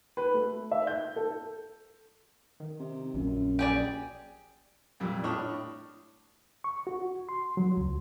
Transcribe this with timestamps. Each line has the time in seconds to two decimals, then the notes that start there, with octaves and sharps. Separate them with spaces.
0.17 B4
0.34 A3
0.71 E5
0.87 G6
1.16 A4
2.60 D#3
2.80 C3
3.14 A#1 F#2
3.59 G4 G#4 D5
5.00 F2 A#2 G3
5.24 A2 D4 C#5 D#6 F6
6.64 C#6
6.87 F#4
7.29 C6
7.57 F#3
7.77 C#2